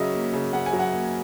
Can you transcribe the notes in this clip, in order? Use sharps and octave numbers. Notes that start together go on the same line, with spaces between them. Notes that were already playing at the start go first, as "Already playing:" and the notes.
Already playing: C#3 F#3 D#5 E5
A#3
C#3
C#3 F#5
G#5
F#3
F#5
A#3